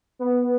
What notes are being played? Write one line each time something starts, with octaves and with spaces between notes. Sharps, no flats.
B3